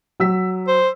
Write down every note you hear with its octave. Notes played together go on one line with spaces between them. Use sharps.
F#3 E6 B6
C5